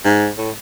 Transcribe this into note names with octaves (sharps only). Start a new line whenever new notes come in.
G#2
A2